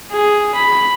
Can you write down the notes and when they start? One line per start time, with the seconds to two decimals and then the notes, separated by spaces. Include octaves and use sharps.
0.12 G#4
0.55 B5